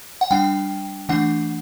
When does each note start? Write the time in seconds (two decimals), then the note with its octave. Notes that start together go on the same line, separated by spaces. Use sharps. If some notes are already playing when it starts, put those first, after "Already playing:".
0.21 F#5
0.31 G3 D4 G5
1.09 E3 A3 D4 F#5